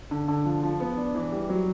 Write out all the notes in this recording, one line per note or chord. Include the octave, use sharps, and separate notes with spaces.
D3
D3
F3
F3
B3
D4
E3
G3
F#3